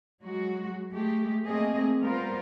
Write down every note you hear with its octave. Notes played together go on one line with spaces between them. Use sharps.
F#3 G#3 F#4
G#3 A3 G4
A3 A#3 C4 G#4 D#5
G3 B3 F4 A#4 C5